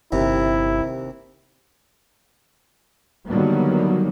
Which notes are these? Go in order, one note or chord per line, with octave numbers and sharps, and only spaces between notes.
G1 D#2 C3 E4
D3 D#3 F#3 G3 A#3 B3